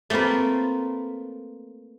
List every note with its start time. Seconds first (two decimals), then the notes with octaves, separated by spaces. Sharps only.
0.10 A3 A#3 C4 F4 B4